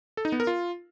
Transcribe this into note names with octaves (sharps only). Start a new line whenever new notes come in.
A4
D#4
B3
A#4
F4